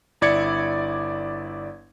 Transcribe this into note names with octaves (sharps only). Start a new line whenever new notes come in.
G1 E4 D5 G#6 C#7